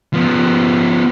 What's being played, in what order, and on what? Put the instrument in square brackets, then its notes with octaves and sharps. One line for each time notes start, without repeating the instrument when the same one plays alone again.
[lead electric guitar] F3 B3